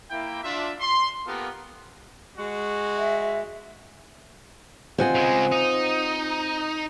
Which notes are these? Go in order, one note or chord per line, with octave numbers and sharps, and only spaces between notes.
A#3 E4 G5
D4 F4 E5
C6
A#3 B3 F4 G4 A4 A#4
G#3 F#4
E5
C4 F4 C5 D#5 F#5 G#5
C#3 G#3
D#4